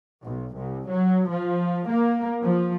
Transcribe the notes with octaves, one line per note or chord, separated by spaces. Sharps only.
B1
C2
F#3
F3
A#3
F3